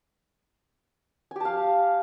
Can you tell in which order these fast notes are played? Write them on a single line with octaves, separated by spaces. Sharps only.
G#5 G4 A5 F5